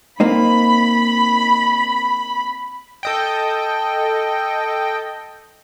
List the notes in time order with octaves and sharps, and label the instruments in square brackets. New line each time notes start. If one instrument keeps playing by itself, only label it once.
[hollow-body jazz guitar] A#3 C4 D#4 [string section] B5
[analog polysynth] A4 D#5 G5